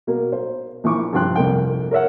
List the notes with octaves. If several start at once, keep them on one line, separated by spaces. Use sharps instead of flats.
B2 A#3
C5
A#1 E3 C#6 D6
G2 C3 F3 G5 C6 F#6
C2 F2 A#3 G5
A#4 C#5 E5 F#5